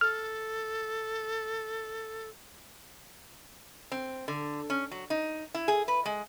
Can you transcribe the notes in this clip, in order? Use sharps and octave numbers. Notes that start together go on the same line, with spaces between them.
A4 F6
C4
D3
C#4
F#3
D#4
E4
G#4
B4
G#3